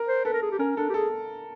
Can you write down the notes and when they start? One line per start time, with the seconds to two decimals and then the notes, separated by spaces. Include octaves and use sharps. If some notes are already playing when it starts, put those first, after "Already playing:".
Already playing: A#4
0.08 C5
0.25 A4 B4
0.33 A#4
0.42 G#4
0.51 G4
0.59 C#4 A#4
0.77 D4 A4
0.89 G4
0.94 G#4 A4